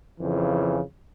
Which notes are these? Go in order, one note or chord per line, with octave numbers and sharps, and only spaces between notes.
F2 C#3 E3